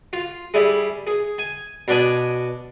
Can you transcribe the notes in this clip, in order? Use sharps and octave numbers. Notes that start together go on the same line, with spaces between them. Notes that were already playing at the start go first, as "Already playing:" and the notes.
F4
G3 E4 G#4
G#4
G#5
B2 D4 D5 G#5 D#6